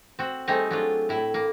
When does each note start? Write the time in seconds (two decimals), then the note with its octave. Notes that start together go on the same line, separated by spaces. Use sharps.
0.19 C4 F#4
0.47 G3 A3 C4 D#4 G#4 D#5
0.71 F#3 D4 F4
1.09 A2 E4
1.34 A#3